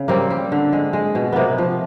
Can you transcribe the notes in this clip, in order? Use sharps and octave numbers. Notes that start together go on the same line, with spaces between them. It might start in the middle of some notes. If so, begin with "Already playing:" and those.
Already playing: C#3
G3 A#3 C4
G3
D3
G#3
G#3
B2
C3 A#3 B3
F3